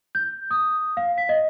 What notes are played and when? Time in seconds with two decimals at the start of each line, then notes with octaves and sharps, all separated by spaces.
0.15 G6
0.51 D#6
0.97 F5
1.18 B6
1.29 D#5